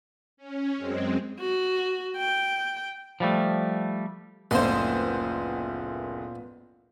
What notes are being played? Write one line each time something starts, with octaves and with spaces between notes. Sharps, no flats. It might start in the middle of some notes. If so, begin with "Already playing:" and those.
C#4
F#2 G#3 C4
F#4
G5
F3 G3 A3
F#1 D2 A#2 B3 F4 C5 F5 C6